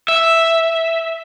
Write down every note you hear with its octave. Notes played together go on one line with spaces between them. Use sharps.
E5